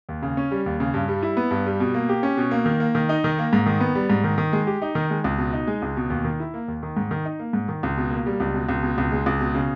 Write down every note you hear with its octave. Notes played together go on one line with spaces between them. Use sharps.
D#2
C#3
C#4
G3
D#2
C#3
G2
G3
E4
B3
G2
G3
B2
A#3
G4
C#4
B2
A#3
D#3
A#3
D#3
D#4
D#3
A#3
G#2
D#3
B3
G3
G#2
D#3
D#3
G#3
G4
D#4
D#3
G#3
C#2
B2
D#4
G#3
C#2
B2
D#2
D#3
E4
A#3
D#2
D#3
G#2
D#3
D#4
A#3
G#2
D#3
C#2
B2
A#3
G3
C#2
B2
C#2
B2
C#2
G#3
C#2
B2
C#3